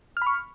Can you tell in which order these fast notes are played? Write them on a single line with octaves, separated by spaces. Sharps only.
F6 B5 C#6